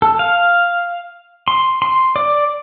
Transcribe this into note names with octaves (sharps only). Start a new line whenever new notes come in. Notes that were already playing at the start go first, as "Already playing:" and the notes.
A4
F5
C6
C6
D5